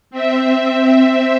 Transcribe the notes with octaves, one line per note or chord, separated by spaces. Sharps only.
C4 E5